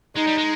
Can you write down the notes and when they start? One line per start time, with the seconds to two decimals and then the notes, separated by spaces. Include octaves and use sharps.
0.16 G#3 D#4
0.27 G3
0.38 G#3